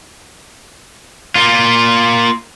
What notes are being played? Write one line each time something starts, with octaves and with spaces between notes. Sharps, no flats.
A#3 F4